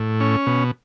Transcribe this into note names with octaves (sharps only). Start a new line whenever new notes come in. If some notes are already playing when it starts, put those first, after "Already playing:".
Already playing: A2
C#4
B2